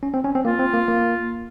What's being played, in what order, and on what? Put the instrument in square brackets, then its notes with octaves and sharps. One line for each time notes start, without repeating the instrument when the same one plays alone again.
[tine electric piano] C#4
C4
C#4
C4
[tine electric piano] A#3 [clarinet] F4
[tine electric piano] C4
A#3
A#3